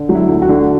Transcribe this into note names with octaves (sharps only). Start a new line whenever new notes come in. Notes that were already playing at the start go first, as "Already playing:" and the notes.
Already playing: D3
F#3
E4
D2
F#4
D3